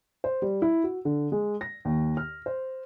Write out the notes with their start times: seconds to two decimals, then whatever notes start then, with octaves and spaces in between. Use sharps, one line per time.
0.24 C5
0.42 G3
0.62 E4
0.84 F#4
1.05 D3
1.32 G#3
1.61 A#6
1.85 D#2
2.17 F6
2.46 C5